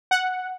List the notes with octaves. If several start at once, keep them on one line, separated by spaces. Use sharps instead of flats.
F#5